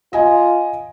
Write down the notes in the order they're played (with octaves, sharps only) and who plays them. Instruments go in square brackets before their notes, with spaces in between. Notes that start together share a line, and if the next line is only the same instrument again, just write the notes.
[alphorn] F4 [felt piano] D#5 G#5